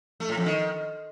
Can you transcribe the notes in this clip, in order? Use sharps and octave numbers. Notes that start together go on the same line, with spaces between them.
A3
A2
F2
D#3